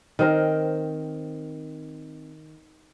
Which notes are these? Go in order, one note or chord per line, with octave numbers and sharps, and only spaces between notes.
D#3 C4 A#4